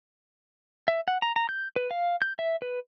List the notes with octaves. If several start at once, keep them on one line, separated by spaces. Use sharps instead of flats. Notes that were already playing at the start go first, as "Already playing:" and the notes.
E5
F#5
A#5
A#5
G6
B4
F5
G6
E5
B4